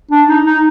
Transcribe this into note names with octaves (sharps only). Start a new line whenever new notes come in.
D4
D#4
D#4